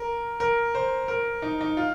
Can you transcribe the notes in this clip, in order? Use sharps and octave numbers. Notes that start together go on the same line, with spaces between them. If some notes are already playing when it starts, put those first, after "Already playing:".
Already playing: A#4
A#4
C5
A#4
D#4
D#4
F4